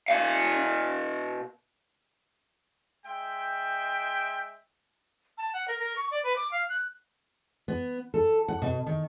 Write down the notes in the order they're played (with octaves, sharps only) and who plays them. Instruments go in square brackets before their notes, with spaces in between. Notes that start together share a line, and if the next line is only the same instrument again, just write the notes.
[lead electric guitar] B2 F5
[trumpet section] G#3 E5 G5
[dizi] A5
F#5
A#4
A#4
C#6
D5
B4
D6
F5
F#6
[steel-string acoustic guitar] B3
A4
F#5
B2
D#3